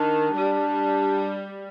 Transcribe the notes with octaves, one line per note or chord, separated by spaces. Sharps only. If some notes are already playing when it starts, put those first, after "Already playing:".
Already playing: D#3 D4
G3